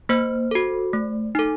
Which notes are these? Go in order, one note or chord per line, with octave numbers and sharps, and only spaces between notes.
A#3 C5
F#4 A4
A3
D#4 A4